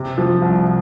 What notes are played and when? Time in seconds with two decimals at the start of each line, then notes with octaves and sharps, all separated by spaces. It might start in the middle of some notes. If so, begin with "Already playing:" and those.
Already playing: C3 G4
0.18 F3
0.42 C2